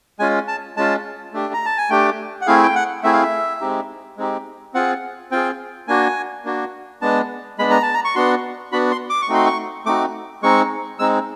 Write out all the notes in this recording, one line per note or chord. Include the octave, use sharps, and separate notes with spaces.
G#3 C#4 F4 G#5
A5
G#3 C#4 F4 A5
A3 D4 G4
A#5
A5
G#5
A3 D4 G4 G5
F#5
A3 C4 E4 G#4 F5
G5
F#5
A3 C4 E4 G#4 E5
F5
E5
G#3 C4 D#4 G4
G#3 C4 D#4 G4
C4 F4 G#4 F#5
C4 F4 G#4 G5
A#3 D4 F#4 G#5
A#3 D4 F#4
G#3 B3 D4 A5
G#3 B3 D4 B5
A#5
A5
A#5
C#6
B3 D4 F#4 C6
B3 D4 F#4 B5
C6
D6
C#6
A3 C4 D#4 F#4 C6
C#6
A3 C4 D#4 F#4 D6
G#3 C4 D#4 C#6
G#3 C4 D#4 E6